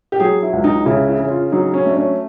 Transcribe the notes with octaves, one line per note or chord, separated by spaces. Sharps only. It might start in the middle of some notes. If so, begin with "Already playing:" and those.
G4
F#3 G#4
E4
C#2
D#4
C#3 E4
E4
C#3
F4
F#3 D#4
C#4
A3 D4
C#4